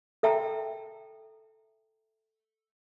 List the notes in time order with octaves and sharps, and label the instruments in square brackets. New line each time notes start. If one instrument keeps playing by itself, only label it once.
[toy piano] A4 E5 G5 A5 A#5